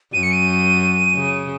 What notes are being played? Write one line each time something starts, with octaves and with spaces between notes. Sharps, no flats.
F#2 D#7
C#7
D#7
C#3